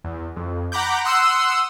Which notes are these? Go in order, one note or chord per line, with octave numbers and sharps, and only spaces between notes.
E2
F2
F#5 A#5 B5 D6 G6
F#5 C6 D#6 E6